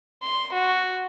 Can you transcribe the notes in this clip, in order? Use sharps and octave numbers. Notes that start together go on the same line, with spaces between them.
C6
F#4